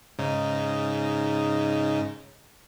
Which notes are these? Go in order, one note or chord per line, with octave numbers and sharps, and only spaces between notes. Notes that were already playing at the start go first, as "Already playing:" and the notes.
G#2 C#3 D#4